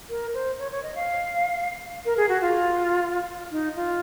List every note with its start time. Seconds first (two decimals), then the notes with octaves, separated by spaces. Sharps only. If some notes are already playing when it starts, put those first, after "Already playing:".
0.09 A#4
0.34 C5
0.59 C#5
0.72 C#5
0.83 D#5
0.95 F5
2.05 A#4
2.17 G#4
2.29 F#4
2.42 F4
3.51 D#4
3.76 F4